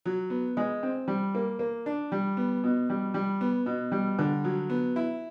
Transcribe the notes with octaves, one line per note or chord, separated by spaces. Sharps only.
F#3
B3
G#3
C4
G3
A#3
A#3
D4
G3
B3
B2
G3
G3
B3
B2
G3
D3
F#3
B3
E4